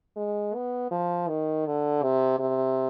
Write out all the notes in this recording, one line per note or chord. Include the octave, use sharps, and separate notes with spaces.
G#3
B3
F3
D#3
D3
C3
C3